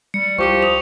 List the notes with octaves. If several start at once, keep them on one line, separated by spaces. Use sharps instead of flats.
G3 C#7
C2 F3 G4 C#6 D6 C#7
D#6 F7